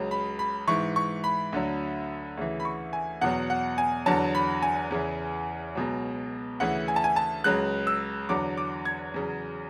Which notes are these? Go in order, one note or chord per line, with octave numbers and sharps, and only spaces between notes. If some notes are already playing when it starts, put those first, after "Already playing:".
Already playing: C#2 C#3 F#3
B5
B5
G#2 E3 C#6
C#6
B5
D2 D3 F#3
D2 C#3 E3
B5
C#6
G#5
E2 B2 F#3 F#5
F#5
G#5
E2 D3 F#3 A5
B5
G#5
E2 C#3 E3
C#2 B2 F#3
D2 C#3 E3 F#5
G#5
A5
G#5
A5
C#2 C#3 F#3 F#6
E6
E2 D3 F#3 D6
D6
G#6
E2 C#3 F#3